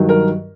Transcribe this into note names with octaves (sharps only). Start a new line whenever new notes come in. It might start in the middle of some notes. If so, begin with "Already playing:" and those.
Already playing: G2 D#3 F#3
A#4